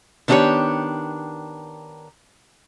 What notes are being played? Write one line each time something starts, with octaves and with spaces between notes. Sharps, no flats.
D#3 B3 D4 E4 G4 C#5